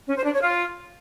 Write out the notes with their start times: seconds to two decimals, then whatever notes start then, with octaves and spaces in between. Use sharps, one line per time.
0.07 C#4
0.16 C5
0.24 D4
0.33 C#5
0.41 F4